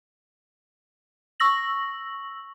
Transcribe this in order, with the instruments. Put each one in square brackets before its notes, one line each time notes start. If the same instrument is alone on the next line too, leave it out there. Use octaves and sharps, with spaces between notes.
[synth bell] C#6 E6 A#6 F#7